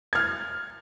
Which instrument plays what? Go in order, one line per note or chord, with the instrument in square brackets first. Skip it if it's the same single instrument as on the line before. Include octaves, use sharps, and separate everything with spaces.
[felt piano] F6 G#6